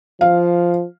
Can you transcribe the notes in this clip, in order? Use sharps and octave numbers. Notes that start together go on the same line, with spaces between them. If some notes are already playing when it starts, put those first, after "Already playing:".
F3 F5